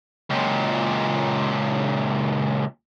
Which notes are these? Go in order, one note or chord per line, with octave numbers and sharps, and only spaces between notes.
C#2 A#2